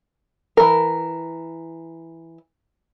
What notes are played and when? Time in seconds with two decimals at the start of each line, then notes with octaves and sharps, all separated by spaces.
0.57 E3 A#4